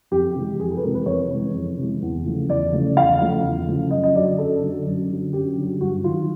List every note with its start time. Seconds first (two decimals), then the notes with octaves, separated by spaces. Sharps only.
0.11 F2 G4
0.35 C3 E3 G#3
0.59 F2 G#4
0.71 A4
0.77 B4
0.83 C3 E3 G#3 A#4
0.95 B4
1.06 F2 C#5
1.30 C3 E3 G#3
1.54 F2
1.78 C3 E3 G#3
2.02 E2
2.26 C#3 F3 A3
2.49 E2 D5
2.72 C#3 F3 A3
2.96 E2 F5
3.20 C#3 F3 A3
3.43 E2
3.67 C#3 F3 A3
3.91 F#2 D#5
4.04 D#5
4.15 D3 F#3 D5
4.38 F#2 A4
4.62 D3 F#3
4.86 F#2
5.10 D3 F#3
5.33 F#2 G4
5.58 D3 F#3
5.81 G2 F#4
6.04 D#3 F#3 F4